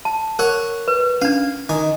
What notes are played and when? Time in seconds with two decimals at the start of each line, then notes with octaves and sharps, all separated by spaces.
0.05 A5
0.39 A#4 C#5 F#5
0.88 B4
1.22 C#4 D4 F5
1.69 D#3 G#5